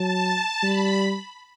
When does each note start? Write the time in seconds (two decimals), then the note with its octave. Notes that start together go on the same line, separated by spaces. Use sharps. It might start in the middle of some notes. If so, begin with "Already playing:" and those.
Already playing: F#3 A5
0.62 G3 B5